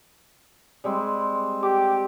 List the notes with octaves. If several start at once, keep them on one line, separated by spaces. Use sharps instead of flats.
G3 G#3 C4
G4 D6